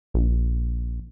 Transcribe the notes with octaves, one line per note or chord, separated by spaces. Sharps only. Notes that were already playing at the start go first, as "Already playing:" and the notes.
A#1